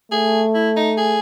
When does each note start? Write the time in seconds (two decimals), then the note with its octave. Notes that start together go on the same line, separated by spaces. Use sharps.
0.12 A3 G#4
0.54 E4
0.76 D#4
0.97 G#4